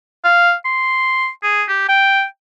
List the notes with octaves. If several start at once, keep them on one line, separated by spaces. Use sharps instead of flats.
F5
C6
G#4
G4
G5